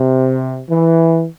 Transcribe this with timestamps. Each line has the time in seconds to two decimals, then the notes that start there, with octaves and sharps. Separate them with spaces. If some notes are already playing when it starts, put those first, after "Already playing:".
Already playing: C3
0.69 E3